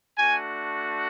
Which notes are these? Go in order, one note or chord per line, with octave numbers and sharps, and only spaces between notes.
A3 D4 F#4 G#5